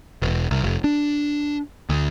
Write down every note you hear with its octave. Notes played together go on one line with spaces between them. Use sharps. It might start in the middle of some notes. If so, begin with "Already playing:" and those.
E1
C2
F1
D4
D2